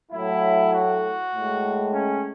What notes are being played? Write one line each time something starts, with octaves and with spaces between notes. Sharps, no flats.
A2 F#3 A3 E4
F#4
A2 G#3
C#4